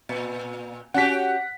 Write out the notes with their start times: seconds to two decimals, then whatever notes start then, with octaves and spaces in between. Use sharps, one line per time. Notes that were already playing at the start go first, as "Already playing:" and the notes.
0.09 A#2
0.94 C#4 F#4 G4 F#5 B6